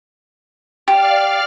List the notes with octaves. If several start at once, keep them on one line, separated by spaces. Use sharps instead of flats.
G4 D5 F5 F6